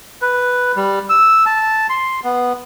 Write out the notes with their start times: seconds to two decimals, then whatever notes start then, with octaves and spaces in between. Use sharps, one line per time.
0.22 B4
0.76 G3
1.09 E6
1.46 A5
1.89 C6
2.24 B3